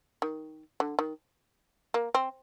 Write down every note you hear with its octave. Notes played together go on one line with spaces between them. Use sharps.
D#3
D3
D#3
A#3
C4